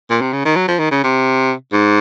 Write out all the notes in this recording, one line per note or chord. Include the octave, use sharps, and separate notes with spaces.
A#2
C3
C#3
D#3
F#3
F3
D#3
C#3
C3
G#2